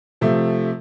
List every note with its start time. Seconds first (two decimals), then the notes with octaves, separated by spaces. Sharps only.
0.21 C3 F3 A3